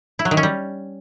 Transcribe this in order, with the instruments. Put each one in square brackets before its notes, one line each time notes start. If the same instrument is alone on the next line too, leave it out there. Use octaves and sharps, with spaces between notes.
[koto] E4
F#3
D#3
C#4
G3